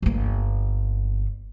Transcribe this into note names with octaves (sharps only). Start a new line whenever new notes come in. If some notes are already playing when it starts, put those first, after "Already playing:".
G1 A#3